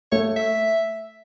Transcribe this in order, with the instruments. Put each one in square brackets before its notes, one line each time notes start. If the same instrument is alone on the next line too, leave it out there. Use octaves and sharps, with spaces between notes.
[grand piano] A3 [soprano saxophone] C#5
[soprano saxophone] E5